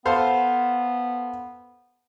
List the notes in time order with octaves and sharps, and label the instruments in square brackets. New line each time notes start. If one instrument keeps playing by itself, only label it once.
[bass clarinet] B3 [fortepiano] A4 C5 F5